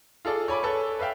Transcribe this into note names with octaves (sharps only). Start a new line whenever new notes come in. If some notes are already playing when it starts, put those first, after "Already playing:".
F4 G#4 A4 D5
C#5 G#5 B5 D6
A4 B4 C#5
B4 E5 F5 G5